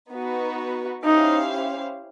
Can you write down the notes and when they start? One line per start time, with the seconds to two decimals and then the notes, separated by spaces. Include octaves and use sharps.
0.10 B3 D#4 F#4 B4
1.04 C#4 D#4 E4 G4 C5 F5